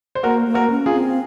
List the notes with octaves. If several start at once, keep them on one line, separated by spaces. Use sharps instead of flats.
C5
A#3 F#4 A#4
A#3
F#4 A#4
C#4
F4 G#4
C4